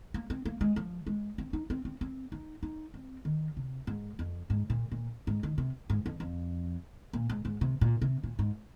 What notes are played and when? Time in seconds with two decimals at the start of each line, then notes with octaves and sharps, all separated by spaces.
0.14 A#3
0.30 C4
0.45 A#3
0.61 G#3
0.76 F3
1.07 G#3
1.38 C4
1.53 D#4
1.70 C4
1.85 C4
2.01 C4
2.32 D#4
2.63 D#4
2.94 C4
3.25 D#3
3.57 C3
3.87 G#2
4.19 F2
4.50 G#2
4.70 A#2
4.92 A#2
5.27 G#2
5.43 D#3
5.58 C3
5.90 G#2
6.06 F2
6.20 F2
7.13 A#2
7.30 G#2
7.45 G#2
7.61 C3
7.81 A#2
8.02 C3
8.23 A#2
8.39 G#2